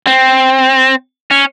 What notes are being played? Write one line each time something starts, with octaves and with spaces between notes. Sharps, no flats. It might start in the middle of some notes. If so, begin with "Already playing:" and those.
C4
C#4